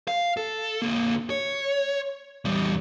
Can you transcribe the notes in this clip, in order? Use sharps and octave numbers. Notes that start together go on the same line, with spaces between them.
F5
A4
D3 A#3
C#5
E2 G3